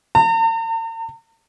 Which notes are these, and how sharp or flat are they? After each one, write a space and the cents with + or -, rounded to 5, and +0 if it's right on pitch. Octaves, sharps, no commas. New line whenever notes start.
A#5 -45